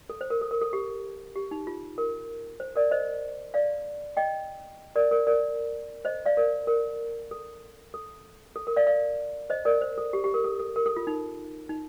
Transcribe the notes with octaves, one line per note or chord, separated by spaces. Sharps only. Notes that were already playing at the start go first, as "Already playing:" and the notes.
A4
C5
A#4
A4
A#4
A4
G4
G4
D#4
F4
A#4
C5
A#4 D5
C5 D#5
D5 F5
D#5 G5
A#4 D5
A#4
A#4 D5
C5 D#5
D5 F5
A#4 D5
A#4
A4
A4
A4
A#4
D5 F5
D5 F5
C5 D#5
A#4 D5
C5
A4
G4
G4
A#4
A4
A4
A#4
A4
F4
D#4
D#4